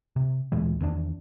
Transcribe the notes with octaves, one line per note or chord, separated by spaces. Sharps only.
C3
D2 A#2 E3 G#3
E2 D#3 C#4 D4